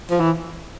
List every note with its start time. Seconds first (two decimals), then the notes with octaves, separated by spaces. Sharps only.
0.11 F3
0.20 E3